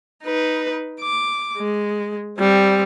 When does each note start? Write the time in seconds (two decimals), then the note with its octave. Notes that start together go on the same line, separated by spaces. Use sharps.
0.24 D#4 B4
1.01 D6
1.58 G#3
2.38 G3 C4